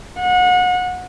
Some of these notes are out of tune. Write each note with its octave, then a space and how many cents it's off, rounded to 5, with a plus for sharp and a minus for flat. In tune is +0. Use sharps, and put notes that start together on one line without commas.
F#5 -30